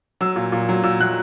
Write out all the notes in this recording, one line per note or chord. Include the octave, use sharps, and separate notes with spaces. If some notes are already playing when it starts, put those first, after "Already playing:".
F#3 E6
A#2
A#2
F#3
A#2 E6
F#3 F#6